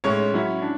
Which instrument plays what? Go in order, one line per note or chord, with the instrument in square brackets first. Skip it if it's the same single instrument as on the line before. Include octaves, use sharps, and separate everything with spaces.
[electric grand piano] A2 G#3 C#4 [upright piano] C#5
[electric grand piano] F#3 C#4 E4
D4